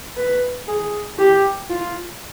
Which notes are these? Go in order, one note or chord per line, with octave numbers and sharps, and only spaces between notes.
B4
G#4
G4
F4